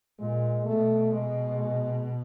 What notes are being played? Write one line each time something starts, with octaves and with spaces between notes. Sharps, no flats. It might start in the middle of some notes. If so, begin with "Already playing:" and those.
A#2 G#3
B2 A3
G#3
G#3